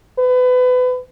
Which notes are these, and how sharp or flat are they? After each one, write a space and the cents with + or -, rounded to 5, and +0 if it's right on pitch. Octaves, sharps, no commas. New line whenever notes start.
B4 +30